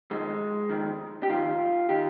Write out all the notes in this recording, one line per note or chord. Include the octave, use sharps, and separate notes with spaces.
F2 D#3 G#3
F2 D#3
G4
F2 D#3 F4
D#3 G4